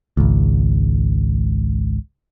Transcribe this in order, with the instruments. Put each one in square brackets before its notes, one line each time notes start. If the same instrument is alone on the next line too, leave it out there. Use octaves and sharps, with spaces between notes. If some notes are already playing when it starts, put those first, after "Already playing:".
[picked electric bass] G#1 C#2